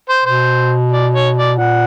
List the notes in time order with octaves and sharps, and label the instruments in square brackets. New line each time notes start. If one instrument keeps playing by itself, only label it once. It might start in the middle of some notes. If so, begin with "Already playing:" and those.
[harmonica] C5
[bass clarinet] B2 [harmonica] C5
[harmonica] D5
C#5
D5
[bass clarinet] A#2 [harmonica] F#5